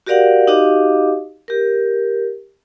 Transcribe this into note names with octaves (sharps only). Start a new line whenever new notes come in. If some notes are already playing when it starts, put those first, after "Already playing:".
F#4 G4 A#4 D5 F5 F#5
D#4 F#4 G4 D#5 F5 D6
G4 A#4